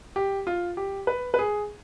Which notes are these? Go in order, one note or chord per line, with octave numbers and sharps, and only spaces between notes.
G4
F4
G4
B4
B4
G#4